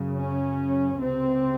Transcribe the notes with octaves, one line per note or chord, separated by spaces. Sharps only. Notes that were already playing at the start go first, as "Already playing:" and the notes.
Already playing: F#2 C#3
C#4
C#2 C3 C4